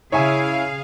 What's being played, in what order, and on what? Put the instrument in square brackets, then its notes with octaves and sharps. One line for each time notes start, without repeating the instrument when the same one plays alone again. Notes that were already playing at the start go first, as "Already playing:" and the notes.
[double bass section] C#3 [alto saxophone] E4 [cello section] G#4 F5 [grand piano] C#5 E5 G#5